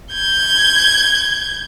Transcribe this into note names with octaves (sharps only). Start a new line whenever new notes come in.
G6 G#6